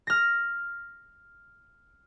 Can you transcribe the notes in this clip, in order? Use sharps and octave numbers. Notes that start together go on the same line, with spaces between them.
F6 A#6